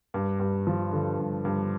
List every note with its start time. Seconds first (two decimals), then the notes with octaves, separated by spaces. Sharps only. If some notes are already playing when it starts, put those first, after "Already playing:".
0.14 G2
0.39 G2
0.67 F3
0.93 D3
1.19 G2
1.45 G2